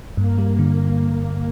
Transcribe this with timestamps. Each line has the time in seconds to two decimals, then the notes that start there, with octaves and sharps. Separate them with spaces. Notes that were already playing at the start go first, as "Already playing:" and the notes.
0.16 G2 A#3
0.38 G3
0.59 D3